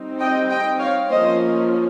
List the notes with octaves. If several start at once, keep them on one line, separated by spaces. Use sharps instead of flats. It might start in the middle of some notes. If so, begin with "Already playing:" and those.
Already playing: G3 C4 D#4
D#5 G5
D#5 G5
C#5 F5
F3 A#3 C#4 C5 D#5